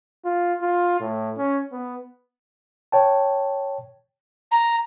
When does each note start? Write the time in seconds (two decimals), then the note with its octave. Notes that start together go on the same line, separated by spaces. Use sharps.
0.25 F4
0.61 F4
1.00 A2
1.37 C#4
1.72 B3
2.92 C#5 G5 A5
4.51 A#5